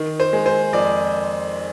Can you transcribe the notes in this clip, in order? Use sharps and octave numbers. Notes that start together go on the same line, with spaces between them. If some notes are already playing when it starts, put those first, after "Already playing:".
Already playing: D#3
C5
G#3
C5
F2 D5